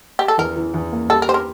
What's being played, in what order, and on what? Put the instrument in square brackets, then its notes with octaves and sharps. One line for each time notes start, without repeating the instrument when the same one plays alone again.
[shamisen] G4
A4
[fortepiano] E2 [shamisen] A#4
[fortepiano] E3
E2
A#3
[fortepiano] G3 [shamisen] A4
[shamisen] A#4
[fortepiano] G4 [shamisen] C5
[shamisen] A#4